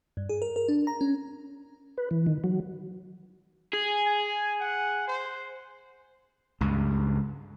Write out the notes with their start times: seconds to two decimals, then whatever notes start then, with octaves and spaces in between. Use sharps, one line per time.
0.17 G2
0.29 G#4
0.42 A#4
0.56 A#4
0.68 D4
0.87 A#5
1.01 C#4
1.98 B4
2.11 E3
2.26 D#3
2.44 F#3
3.73 G#4
4.06 G#5
4.60 F#5
5.08 C5
6.61 C#2 G2